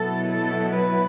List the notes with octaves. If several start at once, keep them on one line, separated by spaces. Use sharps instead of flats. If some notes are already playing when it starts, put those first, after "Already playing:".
Already playing: B2 F#3 B3 E4 A4
A4
B4